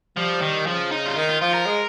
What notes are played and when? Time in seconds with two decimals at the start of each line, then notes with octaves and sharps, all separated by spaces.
0.17 F3 G3
0.42 D#3
0.67 C#3 F3
0.91 D#4
1.06 F4
1.16 D#3 D#4
1.29 F4
1.41 F3 F4
1.54 A#4
1.66 G#3